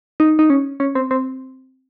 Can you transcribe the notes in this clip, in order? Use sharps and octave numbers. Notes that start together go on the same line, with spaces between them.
D#4
D#4
C#4
C#4
C4
C4